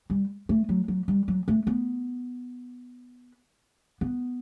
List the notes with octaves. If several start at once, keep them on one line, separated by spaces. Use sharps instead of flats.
G3
A3
F#3
F#3
G3
F#3
A3
B3
B3